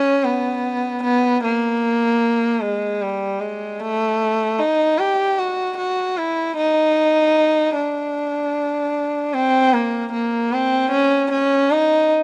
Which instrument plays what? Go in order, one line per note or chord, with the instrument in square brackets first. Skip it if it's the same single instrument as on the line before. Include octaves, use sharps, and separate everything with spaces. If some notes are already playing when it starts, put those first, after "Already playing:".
Already playing: [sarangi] C#4
B3
B3
A#3
G#3
G3
G#3
A3
D#4
G4
F#4
F#4
E4
D#4
D4
C4
A#3
A#3
C4
C#4
C#4
D#4